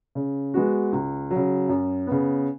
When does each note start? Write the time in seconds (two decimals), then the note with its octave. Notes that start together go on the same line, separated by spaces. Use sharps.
0.15 C#3
0.54 G#3 B3 F#4
0.92 C#2
1.31 F#3
1.36 C#3
1.69 F#2
2.07 C#3 B3